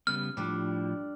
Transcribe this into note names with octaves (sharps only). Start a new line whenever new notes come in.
C#3 G3 B3 F6
A2 F3 G3 D4